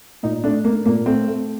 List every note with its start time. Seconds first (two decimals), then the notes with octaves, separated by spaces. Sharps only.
0.23 A#2 D#4
0.44 A3 D4
0.64 A3 A#3
0.86 A#2 A#3
1.06 A3 C4
1.28 A3